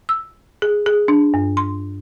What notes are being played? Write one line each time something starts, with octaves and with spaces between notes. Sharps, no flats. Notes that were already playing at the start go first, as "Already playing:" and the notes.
E6
G#4
G#4
D4
G2
C6